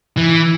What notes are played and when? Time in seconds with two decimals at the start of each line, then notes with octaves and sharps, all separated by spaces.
0.17 E3